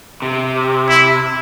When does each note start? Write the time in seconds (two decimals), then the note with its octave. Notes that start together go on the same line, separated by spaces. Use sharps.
0.22 C3
0.89 E4